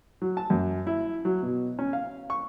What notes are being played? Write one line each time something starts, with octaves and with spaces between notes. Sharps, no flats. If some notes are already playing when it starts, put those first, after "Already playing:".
F#3
A5
F#2
E4
F#3
B2
C#4
F5
C#6